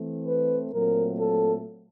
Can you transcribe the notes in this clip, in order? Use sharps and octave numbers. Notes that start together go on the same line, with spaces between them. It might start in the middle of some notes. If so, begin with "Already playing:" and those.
Already playing: E3 A3 C4
B4
A#2 F#3 A3 C4 A#4
A4